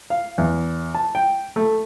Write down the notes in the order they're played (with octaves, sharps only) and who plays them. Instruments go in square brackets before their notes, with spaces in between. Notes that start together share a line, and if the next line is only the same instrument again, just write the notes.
[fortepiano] F5
E2
A5
G5
A3